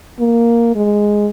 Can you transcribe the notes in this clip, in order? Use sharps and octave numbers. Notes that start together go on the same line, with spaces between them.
A#3
G#3